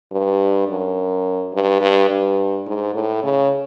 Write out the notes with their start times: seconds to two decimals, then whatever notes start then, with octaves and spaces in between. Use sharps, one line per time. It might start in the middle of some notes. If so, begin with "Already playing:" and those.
0.12 G2
0.68 F#2
1.53 G2
1.81 G2
2.10 G2
2.67 G#2
2.94 A2
3.23 C#3